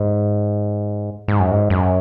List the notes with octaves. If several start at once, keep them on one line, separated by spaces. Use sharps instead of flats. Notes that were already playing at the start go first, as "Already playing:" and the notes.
Already playing: G#2
G#2
F#2
G#2
F#2